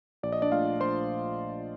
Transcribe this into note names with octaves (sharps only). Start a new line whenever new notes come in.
A#1 D5
D#5
D4 D5
A#2 A3 F4 F5
A#1 C5 C6